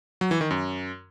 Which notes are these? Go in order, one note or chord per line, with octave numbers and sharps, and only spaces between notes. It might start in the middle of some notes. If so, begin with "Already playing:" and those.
F#3
E3
D#3
F#2